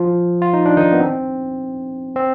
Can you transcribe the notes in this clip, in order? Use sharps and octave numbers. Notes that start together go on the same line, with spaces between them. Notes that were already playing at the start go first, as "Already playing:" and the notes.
Already playing: F3 F4
F4
D#4
D4
D#3 D#4
B3
C4
C4